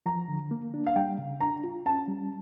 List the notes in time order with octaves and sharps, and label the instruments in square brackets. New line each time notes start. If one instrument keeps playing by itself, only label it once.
[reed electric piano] F3 [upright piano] A#5
[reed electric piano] D3
A#3
D4
[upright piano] F5
[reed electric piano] G3 [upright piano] G5
[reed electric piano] C#3
[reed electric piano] D4 [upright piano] A#5
[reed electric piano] F4
[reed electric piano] C#4 [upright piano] A5
[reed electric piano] G3